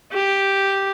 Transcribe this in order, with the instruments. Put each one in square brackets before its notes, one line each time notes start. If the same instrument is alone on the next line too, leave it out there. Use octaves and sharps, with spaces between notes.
[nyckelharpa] G4